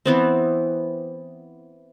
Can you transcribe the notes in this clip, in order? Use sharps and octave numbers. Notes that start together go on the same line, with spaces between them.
E3 B3 C4